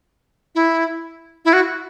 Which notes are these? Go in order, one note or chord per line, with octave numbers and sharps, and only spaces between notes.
E4
E4
F#4